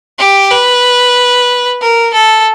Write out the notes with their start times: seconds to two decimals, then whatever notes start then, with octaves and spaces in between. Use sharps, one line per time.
0.19 G4
0.51 B4
1.81 A#4
2.13 A4